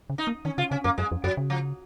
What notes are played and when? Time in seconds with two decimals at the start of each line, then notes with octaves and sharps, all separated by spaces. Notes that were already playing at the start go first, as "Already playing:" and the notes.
0.10 C#3
0.18 D#4
0.27 A#3
0.45 D#3 C#4
0.58 C#3 F4
0.71 C#3 C#4
0.84 F#2 A#3
0.98 F#2 G#3
1.11 F2
1.24 F#2 F#3
1.37 C#3
1.50 F3